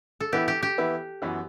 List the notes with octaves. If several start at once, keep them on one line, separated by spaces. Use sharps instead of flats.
A4
E3 B3 E4 G4 B4
G4
G4
E3 B3 E4 B4
F#2 E3 B3 F#4 B4